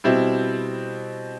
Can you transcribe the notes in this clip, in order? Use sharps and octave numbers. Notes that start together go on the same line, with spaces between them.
B2 G3 C4 E4